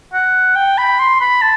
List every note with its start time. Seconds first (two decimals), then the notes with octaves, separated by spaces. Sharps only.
0.13 F#5
0.56 G5
0.78 B5
0.99 C6
1.21 B5
1.41 A5